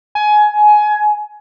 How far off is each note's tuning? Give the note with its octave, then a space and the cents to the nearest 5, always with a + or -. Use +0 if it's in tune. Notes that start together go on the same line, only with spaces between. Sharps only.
G#5 +20